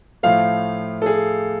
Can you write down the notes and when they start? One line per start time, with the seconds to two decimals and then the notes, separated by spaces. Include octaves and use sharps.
0.23 A2 F3 A3 F5
1.02 A4
1.06 G#4